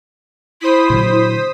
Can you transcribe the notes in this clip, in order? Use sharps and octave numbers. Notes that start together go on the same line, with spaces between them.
E4 C5 D#6 B6
A#2 D3 F#3